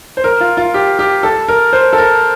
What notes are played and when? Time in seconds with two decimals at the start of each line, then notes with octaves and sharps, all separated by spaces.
0.17 C5
0.24 A#4
0.40 F4
0.57 F4
0.74 G4
0.99 G4
1.23 A4
1.48 A#4
1.73 C5
1.93 A4
1.98 A#4